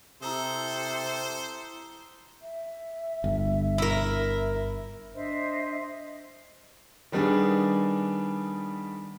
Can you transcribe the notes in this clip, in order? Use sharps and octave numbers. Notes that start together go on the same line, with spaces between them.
C3 E4 A4 C5 A#5 D#6
E5
G1
E4 A#4
D4 C5 D#5 E5
D#3 G3 B3 D4 G#4